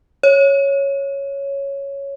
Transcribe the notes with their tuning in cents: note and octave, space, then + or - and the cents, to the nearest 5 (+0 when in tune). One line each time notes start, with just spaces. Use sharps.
C#5 +0